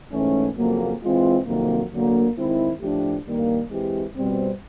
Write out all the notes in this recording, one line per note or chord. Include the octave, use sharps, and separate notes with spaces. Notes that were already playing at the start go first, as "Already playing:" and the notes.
G#2 E3 A3 C#4
F2 C#3 F#3 A#3
E3 G#3 C4 F4
F2 C3 D#3 F#3 A#3
D2 D3 F#3 A#3
D#3 G#3 C4 E4
A2 F3 A3 D4 G4
G2 D#3 G3 A#3
E3 G#3 C4 E4 G4
B2 G3 C4